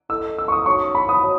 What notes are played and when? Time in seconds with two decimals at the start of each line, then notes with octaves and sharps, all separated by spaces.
0.09 E4 A4 D#5 E6
0.38 E6
0.48 C#6
0.52 D#6
0.66 D#4 F#4 C#5 C#6
0.95 B5
1.09 D#6
1.24 F#4 C#5